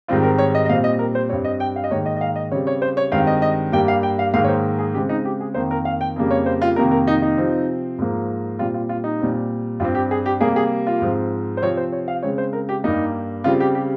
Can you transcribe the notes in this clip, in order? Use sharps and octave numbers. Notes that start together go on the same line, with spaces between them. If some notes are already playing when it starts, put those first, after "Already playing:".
G#2 D#3 G3 C4 F4
A#4
C#5
D#5
D#5
A#2 G3 C4 F5
D#5
A#4
C5
G2 G3 C4 C#5
D#5
G5
F5
D#5
G#2 D#3 A#3 C#5
D#5
D#5
F5
D#5
C#3 G3 C4 C#5
C#5
C5
C#5
G2 D#3 G#3 C4 F5
D#5
D#5
G2 G3 A#3 G5
F5
G5
F5
G#2 D#3 A#3 F5
C#5
C5
G#4
C#3 G#3 C4 G4
D#4
G4
G#4
F2 D#3 A#3 C5
A#4
F5
G5
F2 C#3 G3 A#3
C#5
C5
F4
F2 C3 D#3 A#3 A#4
A#4
D#4
D#4
C3 F3 C4
G#2 F3 A#3
A#2 G3 C4 F4
F4
F4
D#4
A#2 G3 C4
G2 G3 C4 F4
G4
G#4
G4
C3 G3 A#3 G#4
G#4
F4
G#2 F3 C4
C5
C3 F3 C4 C#5
C5
C#5
F5
C#3 G#3 C4 C#5
C5
A#4
G4
G2 G3 A#3 D#4
C#3 G3 C4 F4
G4
G4